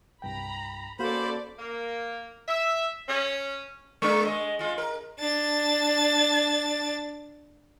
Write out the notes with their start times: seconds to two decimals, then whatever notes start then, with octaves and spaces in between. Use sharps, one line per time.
0.22 C2 G2 G5 A#5 B5
0.99 A#3 C#4 F#4 A4 C5 D5 F5 B5
1.58 A#3
2.47 E5
3.09 C#4
4.02 G#3 D4 A#4
4.25 G#3 D#5
4.59 G#3 F4
4.78 A#4
5.19 D4 A6